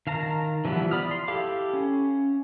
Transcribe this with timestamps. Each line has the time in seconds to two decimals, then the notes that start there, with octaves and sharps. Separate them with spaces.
0.07 D#3 F5 A5 A#5
0.65 E3 F3 G3 B3 E4
0.91 D5 B5 D#6 F6
1.11 C6
1.28 E4 G4 A4 F5 D6
1.73 C#4